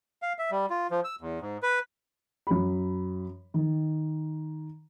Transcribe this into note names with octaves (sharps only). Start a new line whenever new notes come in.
F5
E5
G3
F4
F3
E6
E2
G#2
B4
F#2 B5
D#3